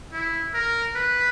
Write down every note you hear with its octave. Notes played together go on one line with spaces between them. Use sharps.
E4
A#4
B4